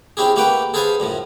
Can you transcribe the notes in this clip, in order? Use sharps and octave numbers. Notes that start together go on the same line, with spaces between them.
C4 C#4 E4 G4 G#4
A3 A#3 G4 B4 F#5 G5
G#4 A4 B4 C5 F5 G#5
F#2 A2 F3